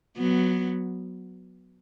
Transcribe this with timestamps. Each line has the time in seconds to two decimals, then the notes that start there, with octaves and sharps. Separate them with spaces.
0.18 F#3 B3